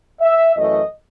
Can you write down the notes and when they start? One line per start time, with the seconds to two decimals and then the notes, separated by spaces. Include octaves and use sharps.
0.20 E5
0.55 F#2 E3 A3 D#5